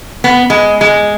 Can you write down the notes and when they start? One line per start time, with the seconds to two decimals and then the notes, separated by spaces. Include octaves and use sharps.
0.24 B3
0.50 G#3
0.81 G#3